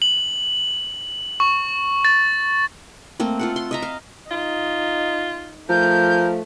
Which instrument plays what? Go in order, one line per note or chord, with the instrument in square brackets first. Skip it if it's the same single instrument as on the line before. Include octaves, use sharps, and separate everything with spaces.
[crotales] F#7
C#6
A6
[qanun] A3 A#3 C4
F4 A4 F#5
C6
D#5 E5 A#5
F5
[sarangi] D#4 [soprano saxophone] F4
[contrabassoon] F3 [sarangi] A3 [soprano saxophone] A#4 [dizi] G6